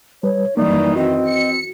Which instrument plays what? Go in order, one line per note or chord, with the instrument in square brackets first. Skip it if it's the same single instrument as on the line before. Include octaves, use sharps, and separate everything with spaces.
[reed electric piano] G3 B4 [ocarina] C#5
[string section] F#2 D#3 E3 [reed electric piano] G3 A#3 [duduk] D#4 [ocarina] D5
[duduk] C4 [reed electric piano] F#4 [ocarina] D#5
[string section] C#7